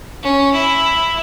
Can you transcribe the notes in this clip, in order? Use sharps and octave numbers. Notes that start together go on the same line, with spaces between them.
C#4
E4